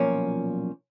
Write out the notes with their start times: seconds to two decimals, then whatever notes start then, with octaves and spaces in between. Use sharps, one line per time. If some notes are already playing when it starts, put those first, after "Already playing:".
Already playing: B1 A#2 F3 A#3 C#4